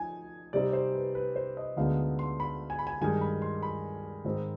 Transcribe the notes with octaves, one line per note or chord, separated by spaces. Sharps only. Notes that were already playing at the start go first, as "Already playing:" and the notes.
Already playing: F3 D#4 G#5
C3 G3 C4 D#4 D5
C5
B4
B4
C5
D#5
D2 D3 G#3 B3 D#4 F5
C6
B5
G#5
B5
G#5
G2 D#3 G#3 G#5
B5
C6
B5
G#2 D#3 G#3 C4 D#4